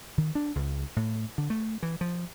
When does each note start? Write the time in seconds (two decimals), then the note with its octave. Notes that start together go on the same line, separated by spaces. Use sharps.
0.18 D#3
0.35 D4
0.55 C#2
0.96 A2
1.38 D3
1.50 A3
1.83 E3
2.01 F3